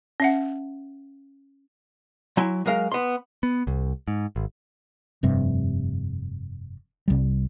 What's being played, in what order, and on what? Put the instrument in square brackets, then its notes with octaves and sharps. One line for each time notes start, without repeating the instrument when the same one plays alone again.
[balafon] C#4 E5 F#5
[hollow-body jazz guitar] F#3 E4 G#5 C6
F#3 G#3 A#4 F5
B3 C6
[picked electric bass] B3
C2
G#2
G#1
[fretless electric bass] F1 G2 C3
C2 G3